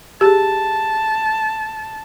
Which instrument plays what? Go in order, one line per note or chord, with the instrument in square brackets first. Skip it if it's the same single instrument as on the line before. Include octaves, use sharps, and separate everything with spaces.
[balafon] G4 G#4 [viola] A5